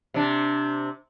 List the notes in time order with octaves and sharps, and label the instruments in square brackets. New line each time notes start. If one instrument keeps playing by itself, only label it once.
[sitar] C3 D4